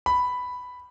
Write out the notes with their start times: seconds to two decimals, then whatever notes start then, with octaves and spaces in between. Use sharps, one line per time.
0.06 B5